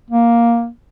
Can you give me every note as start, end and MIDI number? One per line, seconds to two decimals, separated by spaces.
0.10 0.68 58